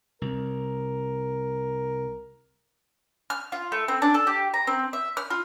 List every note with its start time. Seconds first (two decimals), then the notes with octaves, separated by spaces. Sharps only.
0.22 C2 A#4
3.30 F6
3.52 F4
3.72 A3
3.88 C4
4.02 D4
4.14 A4
4.27 G4
4.54 A#5
4.67 C4
4.93 E5
5.17 F6
5.30 F4